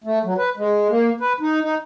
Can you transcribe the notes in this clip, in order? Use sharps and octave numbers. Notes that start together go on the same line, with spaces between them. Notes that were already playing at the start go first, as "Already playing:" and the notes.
A3
F#3
B4
G#3
A#3
B4
D#4
D#4